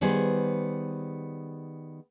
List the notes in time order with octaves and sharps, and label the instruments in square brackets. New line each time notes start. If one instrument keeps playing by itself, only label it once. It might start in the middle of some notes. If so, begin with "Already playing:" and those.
[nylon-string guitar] D#3 G3 B3 G#4 C5